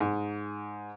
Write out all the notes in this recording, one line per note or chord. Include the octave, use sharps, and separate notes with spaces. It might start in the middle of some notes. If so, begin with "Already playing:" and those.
G#2